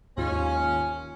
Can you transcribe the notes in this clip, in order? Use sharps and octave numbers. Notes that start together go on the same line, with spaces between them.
D#2 G#2 C#4 F4